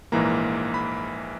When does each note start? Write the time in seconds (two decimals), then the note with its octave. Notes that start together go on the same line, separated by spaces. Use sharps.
0.12 A#1 G#2 E3 A#3 A#5
0.74 B5